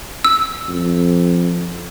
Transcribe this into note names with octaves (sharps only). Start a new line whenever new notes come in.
E6
F2